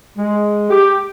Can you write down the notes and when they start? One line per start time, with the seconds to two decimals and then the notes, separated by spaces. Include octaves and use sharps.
0.17 G#3
0.69 G4